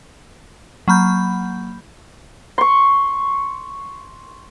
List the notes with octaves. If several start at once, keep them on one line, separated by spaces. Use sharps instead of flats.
F#3 A#3 B5 G6
C6 C#6